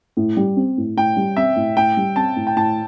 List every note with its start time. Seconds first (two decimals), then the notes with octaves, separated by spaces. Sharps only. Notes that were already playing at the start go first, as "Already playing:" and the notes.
0.17 A2
0.37 G3
0.57 C4
0.78 A2
0.97 A2 G5
1.16 G3
1.37 C4 E5
1.56 A2
1.76 A2 G5
1.97 G3
2.16 C4 A5
2.36 A2
2.47 G5
2.56 A2 A5